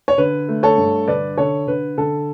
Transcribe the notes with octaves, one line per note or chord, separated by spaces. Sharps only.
C#5
D3 B4
A3
A4 C#5
G2
D3 B4 D5
D3 A4 C#5
D3 B4
D3 A4